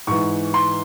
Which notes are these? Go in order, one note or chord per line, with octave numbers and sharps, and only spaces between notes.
G#2 E3 C#6
C6